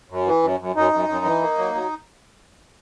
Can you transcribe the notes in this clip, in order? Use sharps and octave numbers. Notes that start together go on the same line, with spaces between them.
F#2
E3
F#2
F#2
F#2 D#4
F#2
F#2
E3
A#3
F#3
F#3